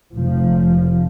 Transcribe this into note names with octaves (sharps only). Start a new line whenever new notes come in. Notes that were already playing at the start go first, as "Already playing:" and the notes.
F1 F3